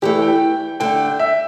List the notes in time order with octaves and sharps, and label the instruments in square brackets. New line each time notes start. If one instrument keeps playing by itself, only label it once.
[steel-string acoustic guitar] E2 E3 A3 [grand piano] G4
[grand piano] G5
[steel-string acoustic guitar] D3 A3 D4 [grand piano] G5
[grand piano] E5